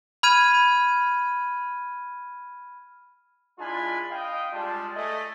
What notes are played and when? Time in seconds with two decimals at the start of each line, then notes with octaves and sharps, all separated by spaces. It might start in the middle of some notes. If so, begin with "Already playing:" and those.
0.23 B5 F6 G#6 D#7
3.59 G#3 D4 E4 F4 G#5 B5
4.11 D#5 F5 G5
4.52 G3 G#3 D4 F4 G4 A5
4.95 A3 D#5 G#5